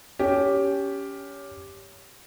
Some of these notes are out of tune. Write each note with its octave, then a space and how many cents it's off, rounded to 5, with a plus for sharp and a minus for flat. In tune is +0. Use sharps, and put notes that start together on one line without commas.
C#4 +20 G4 +0